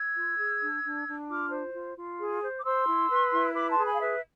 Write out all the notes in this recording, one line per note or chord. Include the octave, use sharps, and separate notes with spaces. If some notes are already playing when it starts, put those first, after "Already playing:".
Already playing: E6 G#6
F4
G#4
D4
D4
D4
F4 D6 F6
C5
F4
F4
G#4
C5
D6
C5 C6 E6
E4
B4
E4
B4 B5 D6
A5 C6
G#4
G#5 B5
F5
B4 E5